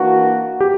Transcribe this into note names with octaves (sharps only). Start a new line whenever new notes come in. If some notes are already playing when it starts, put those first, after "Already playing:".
Already playing: E3 A#3 D4 F#4
G4